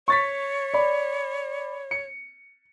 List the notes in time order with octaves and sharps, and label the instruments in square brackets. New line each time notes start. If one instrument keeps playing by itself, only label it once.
[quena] C#5 [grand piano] C#6 A6 B6
[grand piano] D5 B5
C#7